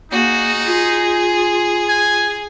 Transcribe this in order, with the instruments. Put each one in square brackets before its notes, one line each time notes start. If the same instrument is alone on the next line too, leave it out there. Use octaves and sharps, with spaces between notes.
[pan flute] A#3 [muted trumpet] D#4 [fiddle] F#4 G#4
[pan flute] F4 [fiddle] G#4
[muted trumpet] G#5